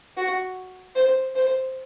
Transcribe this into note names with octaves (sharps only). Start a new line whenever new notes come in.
F#4
C5
C5